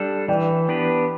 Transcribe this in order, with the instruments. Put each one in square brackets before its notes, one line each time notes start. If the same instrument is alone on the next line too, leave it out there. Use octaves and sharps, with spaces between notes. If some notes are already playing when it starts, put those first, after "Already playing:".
Already playing: [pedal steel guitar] G3 D4 A4
[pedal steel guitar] E3 [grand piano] D5 G5
[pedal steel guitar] B3 D4 G4 B4